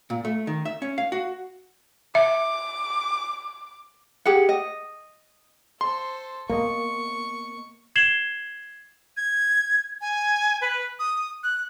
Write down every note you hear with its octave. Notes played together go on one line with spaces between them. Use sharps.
A#2
A3
D#3
E5
C#4
F5
F#4
E5 D6
G4 G#4 F#5
D#5
A4 C5 C6
A#3 B3 D#5 C#6
G#6 C7 E7 F#7 G7
G#6
G#5
B4
D#6
F#6